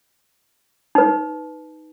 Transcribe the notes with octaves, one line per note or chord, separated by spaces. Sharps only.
D#4 B4